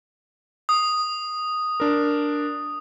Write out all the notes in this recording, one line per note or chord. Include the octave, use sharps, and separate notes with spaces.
D#6
D4 A#4